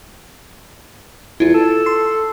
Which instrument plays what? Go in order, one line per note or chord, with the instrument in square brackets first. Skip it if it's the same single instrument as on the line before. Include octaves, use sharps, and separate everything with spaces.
[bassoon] E2 [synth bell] E4 F4
[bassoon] A4
[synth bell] C6 C7